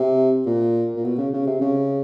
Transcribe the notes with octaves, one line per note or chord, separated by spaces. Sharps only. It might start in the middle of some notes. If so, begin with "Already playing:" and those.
Already playing: C3
A#2
A#2
B2
C#3
C#3
C3
C#3